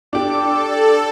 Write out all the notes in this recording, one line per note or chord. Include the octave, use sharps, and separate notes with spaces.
D4 G4 A4 D6
D5